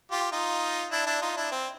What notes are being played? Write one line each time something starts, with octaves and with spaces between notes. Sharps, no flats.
F4 G4
D#4 F4
D4 E4
D4 E4
D#4 F4
D4 E4
C4